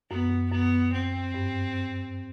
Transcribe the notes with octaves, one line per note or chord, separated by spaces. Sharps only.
F#2 B3
F#2
F#2 B3
C4
G2